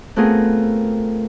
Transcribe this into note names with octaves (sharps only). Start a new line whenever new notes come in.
A3 B3 C4 F4 G#4 A#4